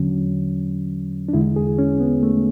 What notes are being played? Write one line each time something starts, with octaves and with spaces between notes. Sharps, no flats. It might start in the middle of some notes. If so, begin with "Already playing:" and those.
Already playing: E2 D3 F#3 C#4
D4
E2 D3 G#3 E4
G#4
C#4
B3
A3